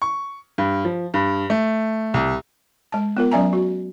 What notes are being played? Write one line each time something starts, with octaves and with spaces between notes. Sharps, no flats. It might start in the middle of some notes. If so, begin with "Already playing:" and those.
C#6
G2
F3
G2
A3
C2
G#3 A5
B3 F4 A#4
F#3 C#4 D5 E5 G#5 A#5
F#4